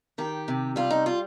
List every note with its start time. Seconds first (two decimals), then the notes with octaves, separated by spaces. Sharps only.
0.18 D#3 G4
0.48 C3
0.76 G3 F4
0.91 D#4
1.06 F4